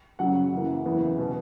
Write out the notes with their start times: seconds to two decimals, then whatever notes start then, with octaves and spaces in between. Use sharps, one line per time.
0.19 F#2 C#3 F#3 F#5
0.53 F#2 C#3 E3 A#3
0.85 E2 C#3 E3 B3
1.18 B2